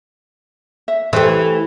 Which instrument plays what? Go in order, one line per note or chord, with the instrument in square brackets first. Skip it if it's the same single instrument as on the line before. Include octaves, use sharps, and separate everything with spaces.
[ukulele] E5
[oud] E3 A3 [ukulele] G4 B4 C5